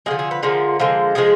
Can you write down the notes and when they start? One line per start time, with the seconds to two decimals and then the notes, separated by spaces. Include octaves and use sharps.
0.06 D3 F3 G#3 G#4
0.19 G#4
0.31 B4
0.43 D3 F3 G#3 A#4
0.79 D3 F3 G#3
1.15 D3 F3 G#3 G#4